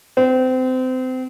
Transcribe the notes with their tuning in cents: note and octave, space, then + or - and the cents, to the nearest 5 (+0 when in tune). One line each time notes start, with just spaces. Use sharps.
C4 -30